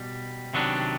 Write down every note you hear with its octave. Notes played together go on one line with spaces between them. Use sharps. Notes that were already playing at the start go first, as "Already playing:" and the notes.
Already playing: B2 G3
C3 D#3 F#3 B3 D4